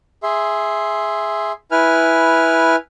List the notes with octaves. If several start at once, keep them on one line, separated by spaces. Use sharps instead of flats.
G#4 E5 C6
E4 B4 G#5 F6